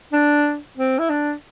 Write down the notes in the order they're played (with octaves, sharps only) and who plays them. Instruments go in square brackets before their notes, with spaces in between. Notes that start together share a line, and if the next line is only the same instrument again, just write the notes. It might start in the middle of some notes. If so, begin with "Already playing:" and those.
[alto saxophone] D4
C4
E4
D4